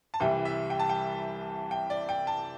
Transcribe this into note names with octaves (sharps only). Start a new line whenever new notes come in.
A5
C2 C3 E3 G3 G5
E5
G5
A5
G5
G5
D5
G5
A5